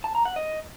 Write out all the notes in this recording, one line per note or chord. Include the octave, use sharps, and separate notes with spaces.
A5
A#5
F#5
D#5